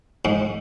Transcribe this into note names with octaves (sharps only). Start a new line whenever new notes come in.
G#2